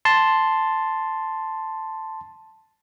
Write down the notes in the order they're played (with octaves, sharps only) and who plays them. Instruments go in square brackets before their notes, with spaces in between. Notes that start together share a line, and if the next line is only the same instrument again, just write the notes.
[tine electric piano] A5 C6